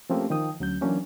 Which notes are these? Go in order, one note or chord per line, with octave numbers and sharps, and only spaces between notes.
F3 A3 A#3 C4 C#4 G4
D#3 F3 G5 D#6
D2 F#3 C#4 G6
E3 F#3 A#3 C#4 D4